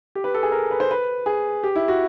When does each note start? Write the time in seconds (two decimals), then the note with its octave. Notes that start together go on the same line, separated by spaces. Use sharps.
0.15 G4
0.24 B4
0.34 A4
0.43 G#4
0.52 A#4
0.71 B4
0.80 C5
0.91 B4
1.26 G#4
1.64 G4
1.75 E4
1.88 F#4